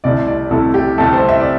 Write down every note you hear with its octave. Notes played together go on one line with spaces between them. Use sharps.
C2 C3 A3 E4 D5
D5
C2 C3 A3 E4 A4
G4
C2 C3 A3 E4 A4
C5
E5
D5